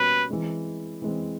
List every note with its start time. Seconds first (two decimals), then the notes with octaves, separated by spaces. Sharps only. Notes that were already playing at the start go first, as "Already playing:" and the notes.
Already playing: B2 G3 A#3 C#4 B4
0.29 E3 G#3 C4
1.02 E3 G#3 C4